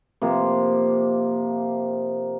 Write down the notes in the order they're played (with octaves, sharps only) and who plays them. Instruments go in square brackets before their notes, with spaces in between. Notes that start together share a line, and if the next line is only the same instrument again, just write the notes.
[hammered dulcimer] C3 F3 A#3